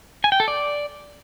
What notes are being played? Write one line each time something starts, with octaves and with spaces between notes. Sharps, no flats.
G#5
G5
A4
D5